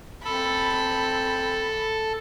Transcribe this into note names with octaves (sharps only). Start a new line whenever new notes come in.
C4 A4 B5